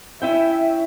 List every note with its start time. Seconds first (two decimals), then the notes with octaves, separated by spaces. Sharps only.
0.22 C#4 E4 E5 G5